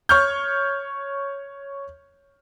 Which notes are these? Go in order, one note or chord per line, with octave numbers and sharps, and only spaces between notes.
C#5 C#6 F6 G6